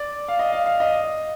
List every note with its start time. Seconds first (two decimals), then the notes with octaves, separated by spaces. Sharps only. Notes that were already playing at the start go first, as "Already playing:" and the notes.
Already playing: D5
0.28 F5
0.39 D#5
0.52 F5
0.66 F5
0.80 D#5